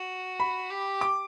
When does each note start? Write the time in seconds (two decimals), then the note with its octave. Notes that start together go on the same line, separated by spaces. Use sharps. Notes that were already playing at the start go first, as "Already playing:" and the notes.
Already playing: F#4
0.40 B5
0.70 G4
1.01 D6